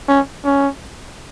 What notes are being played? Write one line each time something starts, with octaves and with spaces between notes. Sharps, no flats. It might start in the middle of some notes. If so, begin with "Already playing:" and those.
C#4
C#4